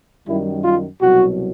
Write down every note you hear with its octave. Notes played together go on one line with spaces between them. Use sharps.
F#2 D#3 G3 E4
F4
C2 B2 F#3 F#4